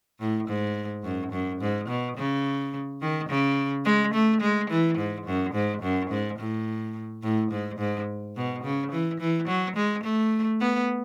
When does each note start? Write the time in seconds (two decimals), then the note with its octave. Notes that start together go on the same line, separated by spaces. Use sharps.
0.20 A2
0.48 G#2
1.04 F#2
1.32 F#2
1.61 G#2
1.89 B2
2.17 C#3
3.01 D#3
3.29 C#3
3.85 G#3
4.14 A3
4.41 G#3
4.70 E3
4.98 G#2
5.26 F#2
5.54 G#2
5.82 F#2
6.10 G#2
6.39 A2
7.23 A2
7.52 G#2
7.79 G#2
8.36 B2
8.64 C#3
8.92 E3
9.20 E3
9.48 F#3
9.76 G#3
10.04 A3
10.61 B3